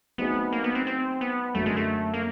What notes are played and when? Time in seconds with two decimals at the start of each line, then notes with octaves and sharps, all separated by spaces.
0.18 F#3 A3 B3 C4 D#4 G#4
0.53 A#3
0.64 B3
0.75 C4
0.87 C4
1.21 B3
1.54 F#2 D3 F#3 A3 A#3
1.66 G#3
1.77 A3
2.14 A#3